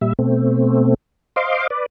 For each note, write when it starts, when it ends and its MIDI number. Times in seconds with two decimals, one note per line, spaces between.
0.01 0.13 46
0.01 0.13 55
0.01 0.13 76
0.19 0.94 47
0.19 0.94 57
0.19 0.94 60
1.36 1.67 72
1.36 1.67 75
1.36 1.67 77
1.36 1.67 84
1.36 1.67 86
1.70 1.86 71
1.70 1.86 74